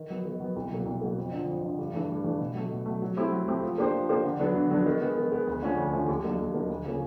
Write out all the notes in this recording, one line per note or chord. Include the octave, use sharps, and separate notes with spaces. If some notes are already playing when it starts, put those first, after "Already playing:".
Already playing: D#3
F#3 B3
D#3
F#3 B3
C2
B2 F#3 A#3
C2
B2 F#3 A#3
F2
D3 F3
F2
D3 F3
G2
E3 A3 D4
G2
E3 A3 D4
B2
F#3 A3
B2
F#3 A3
F#3
A3 C4 E4 G4
F#3
A3 C4 E4 G4
F3
A#3 D4 G4 C5
F3
A#3 D4 G4 C5
D3
F#3 B3 D4
D3
F#3 B3 D4
D#3
G#3 B3
D#3
G#3 B3
D2
D3 F3 A3 C#4
D2
D3 F3 A3 C#4
D#2
D#3 F#3 A#3 D4
D#2
D#3 F#3 A#3 D4
D2
C#3 F3 A#3 C#4